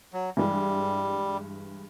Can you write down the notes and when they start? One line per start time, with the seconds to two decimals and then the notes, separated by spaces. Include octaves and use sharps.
0.13 F#3
0.37 G2 E3 G3 G#3